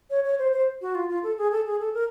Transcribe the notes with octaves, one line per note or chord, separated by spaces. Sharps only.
C#5
C#5
C5
C5
F#4
F4
F4
A4
G#4
A4
G#4
A4
A#4